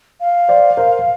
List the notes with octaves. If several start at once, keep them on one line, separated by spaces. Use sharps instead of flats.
F5
C5 D5
A#4 C5